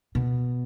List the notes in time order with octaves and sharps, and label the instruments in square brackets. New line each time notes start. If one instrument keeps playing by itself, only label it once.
[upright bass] B2